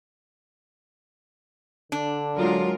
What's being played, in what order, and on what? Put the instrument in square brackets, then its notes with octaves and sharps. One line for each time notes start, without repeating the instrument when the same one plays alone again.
[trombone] D3 [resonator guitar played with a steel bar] D4
[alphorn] F#3 [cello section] G#3 F4 A#4